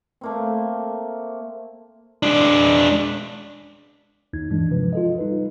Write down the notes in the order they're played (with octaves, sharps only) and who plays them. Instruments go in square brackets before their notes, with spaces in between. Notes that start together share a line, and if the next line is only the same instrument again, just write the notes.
[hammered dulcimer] A3 A#3 C4
[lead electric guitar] G#3 D4
[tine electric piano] D#2 D#4 G#6
G2 E3 G#3 D4
C3 F3 B4
F4 A4 D#5
G3 D#4 B4